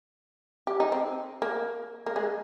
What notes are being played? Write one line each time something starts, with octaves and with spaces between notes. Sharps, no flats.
G4
D#4
C4
A#3
A#3
G#3